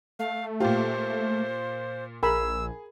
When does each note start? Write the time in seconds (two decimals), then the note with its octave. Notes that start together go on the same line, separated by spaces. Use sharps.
0.19 A3 F5
0.60 A#2 F4 G4 C5
2.23 A#1 G#4 A#4 B5 E6